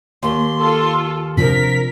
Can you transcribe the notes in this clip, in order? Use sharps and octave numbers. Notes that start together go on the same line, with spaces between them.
D#2 C6
F4 A4
C3 F3 D4 A#4 B6